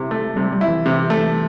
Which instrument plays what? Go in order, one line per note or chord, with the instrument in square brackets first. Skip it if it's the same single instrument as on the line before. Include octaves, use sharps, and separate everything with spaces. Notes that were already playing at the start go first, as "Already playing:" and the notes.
Already playing: [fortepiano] C3 E4
A3
[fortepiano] C3 [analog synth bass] G3
[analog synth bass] G3
[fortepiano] E4
[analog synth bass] E3
[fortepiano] C3
A3